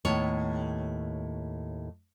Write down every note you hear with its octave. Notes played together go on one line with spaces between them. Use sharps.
D#2 A2 B3 C#5